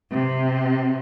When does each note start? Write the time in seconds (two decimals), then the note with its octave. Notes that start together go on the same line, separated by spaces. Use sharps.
0.11 C3